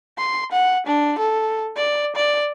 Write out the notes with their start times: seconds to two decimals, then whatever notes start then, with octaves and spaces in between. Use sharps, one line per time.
0.18 C6
0.52 F#5
0.87 D4
1.19 A4
1.77 D5
2.16 D5